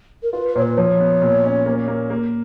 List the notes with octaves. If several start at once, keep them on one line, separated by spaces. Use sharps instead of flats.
A#4
F4 B4
B4
A#2 C#5
B4
F3 C#5
B3
A#2
C#4
A#3
A#3
A#3